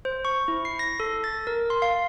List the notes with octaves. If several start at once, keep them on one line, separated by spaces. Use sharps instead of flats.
C5
C#6
E4
C7
A#6
A4
A6
A#4
C6
F5